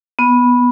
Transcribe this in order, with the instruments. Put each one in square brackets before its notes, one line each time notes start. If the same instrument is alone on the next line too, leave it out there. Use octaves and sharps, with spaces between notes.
[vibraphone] B3